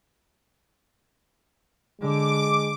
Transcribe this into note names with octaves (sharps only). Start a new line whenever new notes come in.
D3 G#3 D6